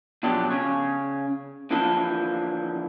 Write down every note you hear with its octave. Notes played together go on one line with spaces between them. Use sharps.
B2 F3 F#3 D4 G4 A4
C#3 C#5
D3 E3 F3 A#3 A4